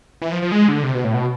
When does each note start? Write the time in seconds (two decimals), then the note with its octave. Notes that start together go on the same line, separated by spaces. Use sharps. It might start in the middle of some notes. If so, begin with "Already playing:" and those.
0.22 E3
0.32 F3
0.42 F3
0.52 G#3
0.69 D3
0.83 C3
0.95 B2
1.04 A2
1.14 B2